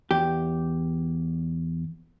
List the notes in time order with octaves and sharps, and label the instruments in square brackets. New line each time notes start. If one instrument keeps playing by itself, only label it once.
[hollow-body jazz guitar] E2 G4